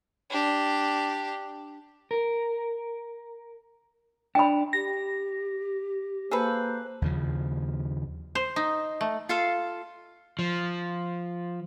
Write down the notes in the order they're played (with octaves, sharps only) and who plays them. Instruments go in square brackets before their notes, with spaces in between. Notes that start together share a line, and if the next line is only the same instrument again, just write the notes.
[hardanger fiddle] D4 G4
[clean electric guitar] A#4
[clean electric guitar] D4 [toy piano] G5 B5
[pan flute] G4 [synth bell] A#6
[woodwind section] A#3 C5 [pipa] G#4 A4 B4
[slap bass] D#2 C#3 F3
[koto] C5
D#4
A3
[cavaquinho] F4 A4 F5
[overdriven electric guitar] F3